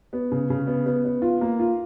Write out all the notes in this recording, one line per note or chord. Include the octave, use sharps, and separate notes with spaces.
B3
C#3
C#3
B3
B3
B3
F4
A#3
F4